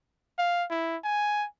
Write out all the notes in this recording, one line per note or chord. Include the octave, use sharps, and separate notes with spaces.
F5
E4
G#5